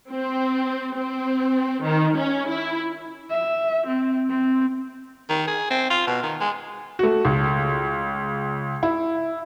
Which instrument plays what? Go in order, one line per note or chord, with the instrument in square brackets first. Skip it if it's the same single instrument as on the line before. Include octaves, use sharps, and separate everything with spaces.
[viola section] C4
C4
D#3
C#4
E4
[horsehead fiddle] E5
C4
C4
[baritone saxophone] D#3
G#4
C4
F4
B2
D#3
G#3
[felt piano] A3 F#4
C#2
E4